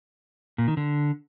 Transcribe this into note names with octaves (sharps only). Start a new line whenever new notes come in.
A#2
D#3
D3